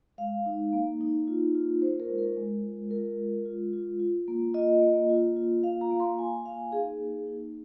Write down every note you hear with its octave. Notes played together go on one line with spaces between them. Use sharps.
G#3 F5
D#4
A#3
D#4
F4
F4
F4 C5
A#4
G#3
A#4
G#3
F4
F4 A#4
G#3
F4
F4
F4
A#3
F4 D#5
A#3
F4
F4
A#3 F5
A#5
A#3
C6
A#3 G#5
A#3 F5
D#4 G#4
A#3
D#4